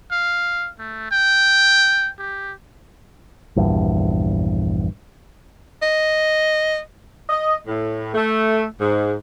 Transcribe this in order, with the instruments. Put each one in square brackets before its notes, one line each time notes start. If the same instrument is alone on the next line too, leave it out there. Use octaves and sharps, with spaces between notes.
[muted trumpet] F5
A3
G5
G4
[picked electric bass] A#1 E2 G2
[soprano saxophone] D#5
[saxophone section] D#5
A2
A3
G#2